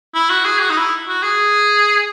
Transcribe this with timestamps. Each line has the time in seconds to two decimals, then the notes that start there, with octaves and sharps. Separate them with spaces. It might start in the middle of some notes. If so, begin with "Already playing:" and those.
0.14 E4
0.30 F#4
0.45 G#4
0.61 F#4
0.70 D#4
0.77 E4
1.08 F#4
1.23 G#4